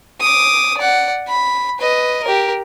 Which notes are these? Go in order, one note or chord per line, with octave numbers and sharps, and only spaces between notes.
D6 D#6
D5 F#5
B5
B4 D#5
G4 A#4